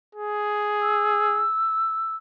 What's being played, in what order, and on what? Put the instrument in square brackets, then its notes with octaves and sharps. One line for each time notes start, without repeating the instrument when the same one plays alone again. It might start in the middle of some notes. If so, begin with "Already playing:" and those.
[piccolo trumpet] G#4
[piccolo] E6